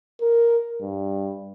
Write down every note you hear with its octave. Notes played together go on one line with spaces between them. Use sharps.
A#4
G2